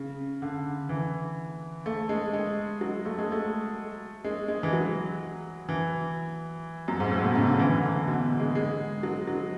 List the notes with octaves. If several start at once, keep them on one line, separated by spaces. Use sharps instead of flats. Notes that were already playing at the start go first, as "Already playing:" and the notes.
Already playing: C#3
D3
E3
A3
G#3
G#3
F#3
A3
G#3
A3
G#3
G#3
E3
F#3
E3
F#2
G#2
A2
B2
C#3
D3
E3
D3
B2
G#3
G#3
F#3
F#3